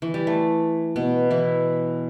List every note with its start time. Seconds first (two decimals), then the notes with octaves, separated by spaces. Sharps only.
0.02 E3
0.14 G3
0.27 A3
0.96 B2 B3
1.31 E3 E4